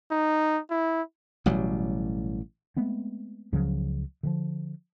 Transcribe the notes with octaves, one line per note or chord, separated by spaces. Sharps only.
D#4
E4
A1 B2 F#3 G3
G#3 A3 B3 C4
C#2 C#3 F3 F#3
D3 E3 F3